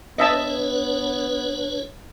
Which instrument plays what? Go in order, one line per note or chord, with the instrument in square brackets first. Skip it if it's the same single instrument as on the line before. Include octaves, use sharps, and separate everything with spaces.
[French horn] B3 [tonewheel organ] D4 B4 C#5 [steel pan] D#5 E5 A5